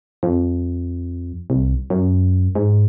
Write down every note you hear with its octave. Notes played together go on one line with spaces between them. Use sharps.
F2
C2
F#2
G#2